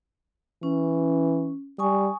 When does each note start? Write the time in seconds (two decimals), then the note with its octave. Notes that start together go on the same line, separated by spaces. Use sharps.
0.63 E3 C#4
1.79 G3 G#5 C#6 D#6